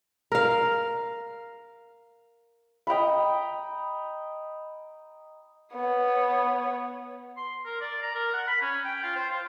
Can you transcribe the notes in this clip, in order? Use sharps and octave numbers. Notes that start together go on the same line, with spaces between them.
A#4 F5
D#5 G5 A#5 B5
B3 C#5
C6
A#4
D5
A#5
A#4
F#5
B5
C#4
G5
F4
C5
F4